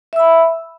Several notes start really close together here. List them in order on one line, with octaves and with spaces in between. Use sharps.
E5 E6 B5